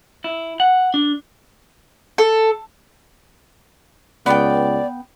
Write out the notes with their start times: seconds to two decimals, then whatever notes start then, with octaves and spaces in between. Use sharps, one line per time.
0.24 E4
0.60 F#5
0.94 D4
2.18 A4
4.26 C#2 B3 D5 G5